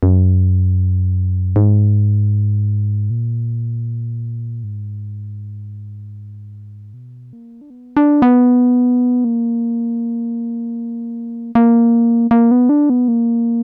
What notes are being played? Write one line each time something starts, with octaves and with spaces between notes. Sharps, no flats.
F#2
G#2
A#2
G#2
B2
A#3
D4
B3
D4
B3
A#3
A#3
A#3
B3
D4
B3
A#3